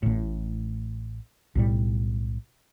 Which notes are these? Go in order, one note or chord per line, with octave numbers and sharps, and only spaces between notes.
A1 A2
B1 A2 G3